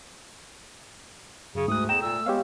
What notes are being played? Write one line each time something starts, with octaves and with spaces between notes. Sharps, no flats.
F#2 C#3
D2 G#2 A3 D#6 F#6
E2 G5 A#5 E7
A#2 E6
G#3 B3 G4 C#5 F5